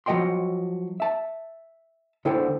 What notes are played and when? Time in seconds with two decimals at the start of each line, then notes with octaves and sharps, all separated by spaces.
0.06 F3 F#3 A#4 D#5 G5 C6
1.00 E5 A5
2.25 D2 D3 E4 A4 C5 G5